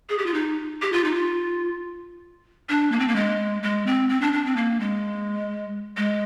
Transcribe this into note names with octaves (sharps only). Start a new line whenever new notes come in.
G#4
G4
F4
D#4
G4
F4
D#4
F4
D4
A#3
C4
A#3
G#3
G#3
C4
C4
D4
D4
C4
A#3
G#3
G#3